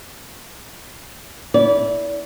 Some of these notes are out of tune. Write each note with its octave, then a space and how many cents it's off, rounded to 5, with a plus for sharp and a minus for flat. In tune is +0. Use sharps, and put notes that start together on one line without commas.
E4 -20 D5 -35